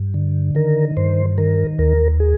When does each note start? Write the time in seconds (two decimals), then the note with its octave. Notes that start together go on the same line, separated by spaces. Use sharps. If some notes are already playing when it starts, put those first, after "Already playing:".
Already playing: G2
0.14 D3
0.55 D#3 A#4
0.97 G2 C5
1.38 D#3 A#4
1.79 D#2 A#4
2.20 G#4